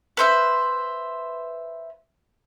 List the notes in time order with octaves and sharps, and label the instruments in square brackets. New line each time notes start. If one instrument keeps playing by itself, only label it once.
[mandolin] B4 C5 E5